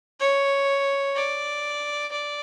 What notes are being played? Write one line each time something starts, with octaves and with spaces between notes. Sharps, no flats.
C#5
D5
D5